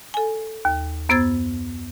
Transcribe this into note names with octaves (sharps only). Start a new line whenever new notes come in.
A4 G#5
D#2
F#2 B3 C5 E6 G#6 A6